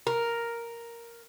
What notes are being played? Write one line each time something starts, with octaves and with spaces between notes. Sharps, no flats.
A#4